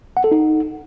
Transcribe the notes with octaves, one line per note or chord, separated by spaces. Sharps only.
F#5
A4
D#4